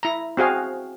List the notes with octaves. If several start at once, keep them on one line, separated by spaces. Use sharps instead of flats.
E4 A#5
C4 F#4 G#4 F5